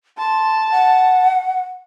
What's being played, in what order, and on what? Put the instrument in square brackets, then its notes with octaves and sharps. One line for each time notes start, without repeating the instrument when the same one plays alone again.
[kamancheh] A5 [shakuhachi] C6
[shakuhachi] F#5